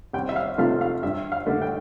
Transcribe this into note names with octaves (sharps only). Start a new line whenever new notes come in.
C2 G5
E5
F5
C3 F3 A3 F5
F5
G2 E5
F5
D3 A3
G5